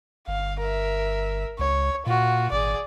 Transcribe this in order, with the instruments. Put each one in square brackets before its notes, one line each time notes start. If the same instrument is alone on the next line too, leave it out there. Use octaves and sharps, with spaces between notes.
[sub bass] G1 [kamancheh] F5
[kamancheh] A#4 E5
[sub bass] C#2 [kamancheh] C#5
[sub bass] A#2 [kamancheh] F4 F#4
[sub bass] G#1 [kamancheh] G#4 D5